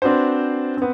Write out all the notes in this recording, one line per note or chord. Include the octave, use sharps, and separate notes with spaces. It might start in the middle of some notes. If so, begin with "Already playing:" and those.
C4 D4 F#4 B4 C5
B3 C4